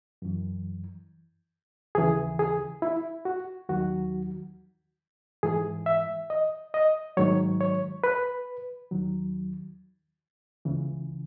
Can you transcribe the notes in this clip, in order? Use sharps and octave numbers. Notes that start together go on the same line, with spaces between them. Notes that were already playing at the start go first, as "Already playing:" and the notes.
F#2 E3
D#2 C#3 E3 G#4
G#4
E4
F#4
D#2 D#3 F#3 F#4
G#2 E3 G#4
E5
D#5
D#5
G#2 D#3 F#3 C#5
C#5
B4
D#2 D#3 F#3
C#2 C#3 E3